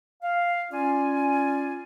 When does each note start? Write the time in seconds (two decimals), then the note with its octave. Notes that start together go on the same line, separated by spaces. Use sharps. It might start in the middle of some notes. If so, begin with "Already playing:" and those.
0.23 F5
0.71 C#4 F4 D5 G#5